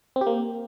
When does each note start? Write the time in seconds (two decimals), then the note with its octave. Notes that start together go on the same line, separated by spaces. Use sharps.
0.16 C4
0.21 G4
0.27 A#3